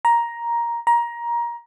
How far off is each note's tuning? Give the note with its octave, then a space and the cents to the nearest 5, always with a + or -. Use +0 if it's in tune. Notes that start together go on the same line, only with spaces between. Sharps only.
A#5 +10
A#5 +20